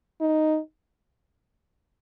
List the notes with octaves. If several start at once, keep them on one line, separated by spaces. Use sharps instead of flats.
D#4